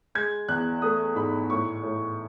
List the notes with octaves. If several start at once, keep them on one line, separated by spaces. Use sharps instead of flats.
G#3 G#6
E2 F#6
A3 D#6
G#2 B5
A2 C#6
A2